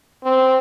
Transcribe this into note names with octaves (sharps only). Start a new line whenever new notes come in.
C4